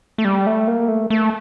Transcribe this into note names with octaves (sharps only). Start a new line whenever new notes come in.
A3
G3
A3
A#3
A3
A3